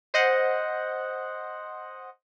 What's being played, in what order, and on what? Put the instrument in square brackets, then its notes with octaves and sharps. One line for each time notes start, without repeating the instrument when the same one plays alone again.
[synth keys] C5 D#5 F#5